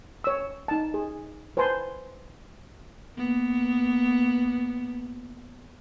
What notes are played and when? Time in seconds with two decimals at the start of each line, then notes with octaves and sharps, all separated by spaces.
0.24 C#5 E6
0.68 D#4 A5
0.94 G#4
1.57 B4 C5 G#5 A5 C6
3.15 A#3 B3